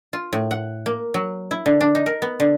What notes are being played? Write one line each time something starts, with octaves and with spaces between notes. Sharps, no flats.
F4
A2
F#5
A#3
F#3
E4
D3
D4
D#4
A#4
B3
D3